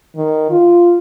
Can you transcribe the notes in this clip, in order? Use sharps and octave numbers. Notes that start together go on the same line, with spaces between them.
D#3
F4